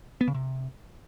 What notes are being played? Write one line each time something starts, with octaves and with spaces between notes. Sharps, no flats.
B3
C#3
C3